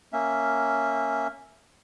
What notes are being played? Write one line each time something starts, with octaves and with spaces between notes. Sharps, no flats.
A#3 C#4 E5